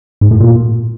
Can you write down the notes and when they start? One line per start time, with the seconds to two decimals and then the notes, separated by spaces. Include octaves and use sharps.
0.21 G#2
0.31 A2
0.41 A#2